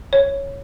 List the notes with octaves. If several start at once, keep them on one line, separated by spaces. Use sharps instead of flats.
C#5